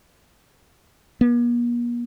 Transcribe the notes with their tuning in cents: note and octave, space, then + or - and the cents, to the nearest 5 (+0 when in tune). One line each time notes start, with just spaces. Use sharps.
A#3 +45